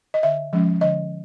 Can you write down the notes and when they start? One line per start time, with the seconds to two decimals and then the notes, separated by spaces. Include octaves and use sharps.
0.14 D#5
0.23 D3 E5
0.53 F3 G#3 C#4
0.81 D3 D#5